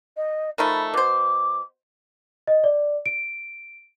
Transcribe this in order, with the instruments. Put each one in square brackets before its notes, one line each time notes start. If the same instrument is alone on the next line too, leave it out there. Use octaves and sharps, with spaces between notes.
[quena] D#5
[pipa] D#3 F3 A3 [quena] B5
[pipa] B2 C5 [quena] D6
[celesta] D#5
D5
D7